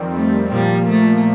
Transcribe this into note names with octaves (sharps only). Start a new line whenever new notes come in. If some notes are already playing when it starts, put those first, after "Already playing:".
Already playing: F2 D#3 G3 C4
A3
A#2 F3 G3 A#3
A3